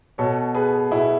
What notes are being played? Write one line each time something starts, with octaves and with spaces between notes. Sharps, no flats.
B2 A4 C#5
G#4 B4
B2 E4 G#4